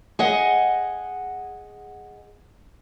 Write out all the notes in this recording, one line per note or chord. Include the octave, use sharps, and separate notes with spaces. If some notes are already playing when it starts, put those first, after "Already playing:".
G#4 D#5 F#5